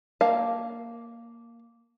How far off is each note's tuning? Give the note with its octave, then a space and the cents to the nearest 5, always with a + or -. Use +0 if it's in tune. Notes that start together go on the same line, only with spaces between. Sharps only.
A#3 +0 F5 +0 A5 +0